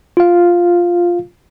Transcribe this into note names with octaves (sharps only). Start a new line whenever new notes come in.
F4 F5